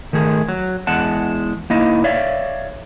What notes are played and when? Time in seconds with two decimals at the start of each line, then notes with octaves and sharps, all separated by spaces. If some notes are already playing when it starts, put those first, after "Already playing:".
0.13 D#3 A3 G#4
0.49 F#3
0.87 E2 G#3 F#5 A5
1.70 A#3 D#4 E4 D#5
2.04 C#5 D5 E5 F5